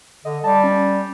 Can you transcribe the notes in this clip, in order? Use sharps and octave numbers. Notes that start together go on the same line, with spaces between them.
D3 D#5
G3 A5
C#4